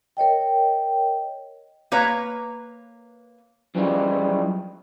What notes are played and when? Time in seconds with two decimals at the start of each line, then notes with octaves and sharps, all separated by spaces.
0.17 A#4 C#5 D#5 G5
1.92 A#3 B4 C#5 A#5
3.75 F#2 E3 F3 G3 G#3